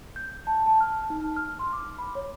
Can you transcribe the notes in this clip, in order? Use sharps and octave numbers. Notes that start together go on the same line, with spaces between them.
G6
A5
A5
F6
D#4
F6
C6
D6
B5
C#5